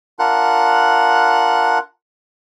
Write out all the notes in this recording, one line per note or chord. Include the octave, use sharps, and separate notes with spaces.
D4 F4 A#4 F#5 F#6